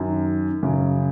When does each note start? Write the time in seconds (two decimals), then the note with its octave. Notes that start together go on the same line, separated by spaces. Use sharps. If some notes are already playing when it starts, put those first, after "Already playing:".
Already playing: F#2 D#3
0.63 F#2 C#3